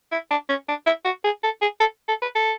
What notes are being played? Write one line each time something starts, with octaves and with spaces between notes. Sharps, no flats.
E4
D4
C#4
D4
E4
F#4
G#4
A4
G#4
A4
A4
B4
A4